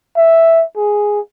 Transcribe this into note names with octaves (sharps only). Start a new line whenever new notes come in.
E5
G#4